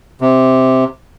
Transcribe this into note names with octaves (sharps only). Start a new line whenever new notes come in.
C3